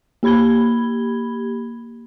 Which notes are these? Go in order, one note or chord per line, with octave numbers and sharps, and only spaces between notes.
A#3 G4 B5 G#6 G7